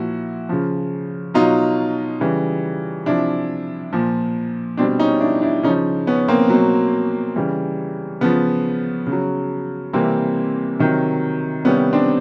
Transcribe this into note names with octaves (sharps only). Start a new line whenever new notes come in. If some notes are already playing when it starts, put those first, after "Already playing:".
Already playing: A#2 F3 E4 F#4
C#3 F3
B2 F#3 D#4 F4
C#3 E3 G3
C3 F3 D4 E4
A#2 F3
B2 C4 D4
G3
C#4 D#4
D4 E4
D4 E4
C#3 F3 C#4 D#4
B3 C#4
A#3 C4
B2 F#3
C#3 E3 G3
C#3 F3 B3
C#3
F#3
C3 E3 G3 A#3 C4
C3 D#3 F#3
C3 D#3 G3 B3 C#4
C4 D4